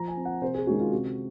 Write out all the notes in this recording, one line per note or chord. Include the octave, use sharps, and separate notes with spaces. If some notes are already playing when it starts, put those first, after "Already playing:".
Already playing: F3 A#5
G#5
C4
F#5
C3 C5
G#4
D#3 G#3 C#4 F#4
F4
C3 F#4